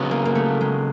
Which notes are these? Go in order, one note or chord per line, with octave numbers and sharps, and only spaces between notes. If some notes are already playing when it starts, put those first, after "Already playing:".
Already playing: C#3 F#3 B3
A#3
A#3
A3
G#3